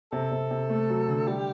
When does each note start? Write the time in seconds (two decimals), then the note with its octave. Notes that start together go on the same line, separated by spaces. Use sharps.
0.12 C3 A4
0.31 C3
0.51 C3
0.69 A3
0.90 F#3
1.08 D3
1.27 G3 G4